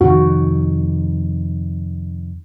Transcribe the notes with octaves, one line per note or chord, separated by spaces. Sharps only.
F2 C3 D#3 F#4